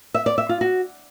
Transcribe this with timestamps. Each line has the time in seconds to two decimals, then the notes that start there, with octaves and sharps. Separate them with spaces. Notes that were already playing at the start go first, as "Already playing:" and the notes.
0.14 E5
0.26 D5
0.38 E5
0.49 F4
0.61 F#4